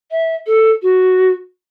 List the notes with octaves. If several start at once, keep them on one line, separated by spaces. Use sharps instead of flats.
E5
A4
F#4